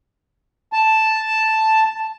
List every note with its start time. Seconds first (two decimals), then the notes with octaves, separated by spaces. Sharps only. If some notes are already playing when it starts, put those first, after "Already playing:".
0.73 A5